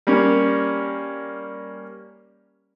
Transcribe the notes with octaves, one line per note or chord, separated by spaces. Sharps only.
G3 A#3 C#4